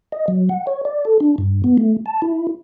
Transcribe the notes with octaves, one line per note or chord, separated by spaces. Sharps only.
D#5
F#3
F#5
C#5
D5
A4
D4
G2
B3
A3
A5
E4